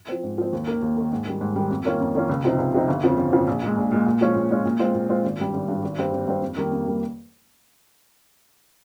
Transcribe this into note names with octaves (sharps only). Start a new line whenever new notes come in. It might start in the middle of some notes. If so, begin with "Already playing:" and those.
F3 C4
G#2
F3 C4
D#2
D#3 A#3
D#2
D#3 A#3
G#2
D#3 G3
G#2
D#3 G3
F2
D#3 A#3 C#4 F4
F2
D#3 A#3 C#4 F4
C#2
C3 F3 C4 D#4
C#2
C3 F3 C4 D#4
G1
F2 C#3 F3 C4
G1
F2 C#3 F3 C4
A#1
A#2 G#3
A#1
A#2 G#3
A#2
F3 G#3 C#4 F4
A#2
F3 G#3 C#4 F4
A#2
G#3 C4 F4
A#2
G#3 C4 F4
G#1
G2 G3
G#1
G2 G3
G#1
G2 G3 C4
G#1
G2 G3 C4
F2
D#3 G3 A#3
F2
D#3 G3 A#3